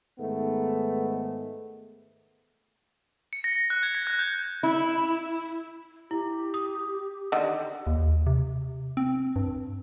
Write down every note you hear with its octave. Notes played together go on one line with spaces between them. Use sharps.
G#2 D#3 A3 B3
C#7
A#6
F#6
G#6
A#6
F#6
G6
E4
E4 G4
D#6
D3 D#3
D#2
C3
C4
G2